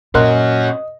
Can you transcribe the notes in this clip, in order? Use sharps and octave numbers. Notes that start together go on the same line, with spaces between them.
A#2 C#4 F#4 A#4 D#5 C6 F#6